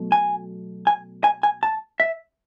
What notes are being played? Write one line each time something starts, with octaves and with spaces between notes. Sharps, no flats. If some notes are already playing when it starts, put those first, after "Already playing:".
Already playing: B2 F#3 A3
G#5
G#5
G#5
G#5
A5
E5